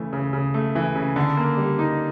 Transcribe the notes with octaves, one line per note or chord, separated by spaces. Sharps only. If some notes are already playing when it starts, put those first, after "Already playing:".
Already playing: C#3 E3 A3
C#3
C#3
A3
E3
C#3
D3
A#3
G3
D#4